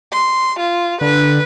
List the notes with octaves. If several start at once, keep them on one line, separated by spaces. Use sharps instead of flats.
C6
F4
D3 B4